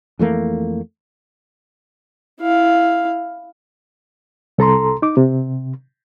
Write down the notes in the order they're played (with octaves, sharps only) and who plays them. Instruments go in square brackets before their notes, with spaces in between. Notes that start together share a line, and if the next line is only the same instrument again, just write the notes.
[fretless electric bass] F2 E3 A3 A#3
[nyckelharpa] E4 F5
[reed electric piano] C2 A4 A#5 C6
D#4 D6
C3